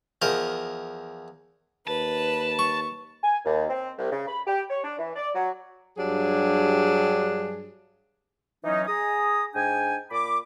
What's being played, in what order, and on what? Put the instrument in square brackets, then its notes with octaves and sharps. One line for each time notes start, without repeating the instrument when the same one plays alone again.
[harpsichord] E2 F3 A#4 D#5
[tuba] D#2 [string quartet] B4 [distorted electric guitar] A5
[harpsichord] C#6
[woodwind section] G#5
D#2
C4
C2
C#3
B5
G4
C#5
D4
E3
D5
F#3
[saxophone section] G2 F#3 D4 G4 G#4
[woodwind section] E3 F#3 C#4 D#4
G#4 G#5 A#5 D#6
G#2 D4 G5 G#5
A#2 B5 D6